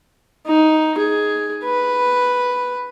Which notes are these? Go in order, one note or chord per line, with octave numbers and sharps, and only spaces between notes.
D#4
G#4
B4